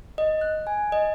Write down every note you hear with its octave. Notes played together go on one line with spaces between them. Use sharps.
D#5
F#6
G#5
D#5